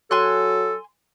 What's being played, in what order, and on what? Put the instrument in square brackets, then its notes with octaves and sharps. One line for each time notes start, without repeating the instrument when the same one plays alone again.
[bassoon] F#3 [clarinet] A4 [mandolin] G#5 C6 F#6